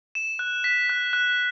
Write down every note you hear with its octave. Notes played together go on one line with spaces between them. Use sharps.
E7
F#6
B6
F#6
F#6